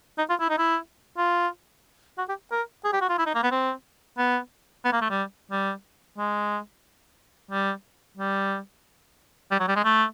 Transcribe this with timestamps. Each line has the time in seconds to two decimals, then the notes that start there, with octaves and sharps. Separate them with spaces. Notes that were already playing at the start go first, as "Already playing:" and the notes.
0.18 D#4
0.29 F4
0.40 E4
0.49 D#4
0.58 E4
1.17 F4
2.18 F#4
2.29 G4
2.51 A#4
2.85 G#4
2.92 G4
3.01 F#4
3.09 F4
3.18 E4
3.26 D#4
3.35 A#3
3.43 B3
3.51 C4
4.17 B3
4.85 B3
4.92 A#3
5.01 A3
5.10 G3
5.51 G3
6.18 G#3
7.51 G3
8.17 G3
9.51 G3
9.59 F#3
9.68 G3
9.76 G#3
9.84 A3